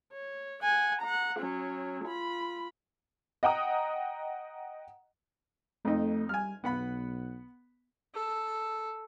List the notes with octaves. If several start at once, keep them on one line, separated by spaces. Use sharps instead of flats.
C#5
F#5 G#5
F#5 A#5
F#3 C#4
F4 B5
D#5 F#5 G5 A#5 D#6
F2 A3 D#4
G3 G#5 F6
B1 B3 F#5 B5
A4